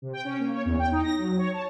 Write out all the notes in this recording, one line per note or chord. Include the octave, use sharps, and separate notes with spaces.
C3
G5
C#4
A#3
C#5
E2
G5
D#4
A#6
F#3
C#5
A5